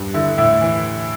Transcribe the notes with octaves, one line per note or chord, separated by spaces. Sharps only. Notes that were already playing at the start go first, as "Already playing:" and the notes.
Already playing: G2
D3 E4
A2 E4
E3